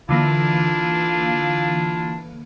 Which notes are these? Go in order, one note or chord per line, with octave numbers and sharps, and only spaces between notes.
D3 E3 A#3 D4 E4 F4